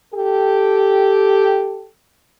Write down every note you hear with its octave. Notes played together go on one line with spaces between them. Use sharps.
G4 A4